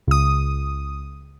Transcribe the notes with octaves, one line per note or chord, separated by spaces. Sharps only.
C#2 D#6